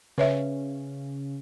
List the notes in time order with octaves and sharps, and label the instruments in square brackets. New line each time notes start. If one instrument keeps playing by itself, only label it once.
[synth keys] C#3 [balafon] B4 C#5 E5